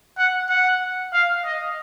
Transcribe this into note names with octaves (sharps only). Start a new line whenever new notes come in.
F#5
F#5
F5
D#5